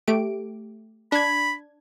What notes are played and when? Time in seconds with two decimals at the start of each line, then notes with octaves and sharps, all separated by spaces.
0.08 A3 G4 D7
1.12 D4 B5 G#6